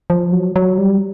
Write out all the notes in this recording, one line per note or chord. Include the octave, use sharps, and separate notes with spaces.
F3
F#3
F#3
G3